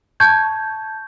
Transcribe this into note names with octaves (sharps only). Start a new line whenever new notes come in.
A5 C#6 G6 G#6